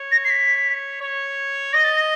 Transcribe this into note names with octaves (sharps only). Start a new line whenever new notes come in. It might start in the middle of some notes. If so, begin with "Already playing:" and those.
Already playing: C#5
A#6
C7
B6
C#5
D#5 A#6
A6
A#6